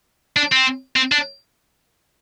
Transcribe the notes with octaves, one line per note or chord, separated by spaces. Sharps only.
D4
C4
C4
D4